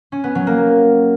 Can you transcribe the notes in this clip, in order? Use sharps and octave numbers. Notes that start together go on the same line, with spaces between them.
C#4
B3
F#3
A#3